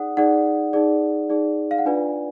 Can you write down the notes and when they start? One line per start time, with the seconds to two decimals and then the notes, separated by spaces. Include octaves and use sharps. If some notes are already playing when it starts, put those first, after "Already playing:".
Already playing: D#4 G#4 D5 F#5 D#6
0.17 D#4 G#4 D5 F#5
0.73 D#4 G#4 D5
1.29 D#4 G#4 D5
1.71 F5
1.78 F#5
1.85 D4 F4 B4 D5 G#5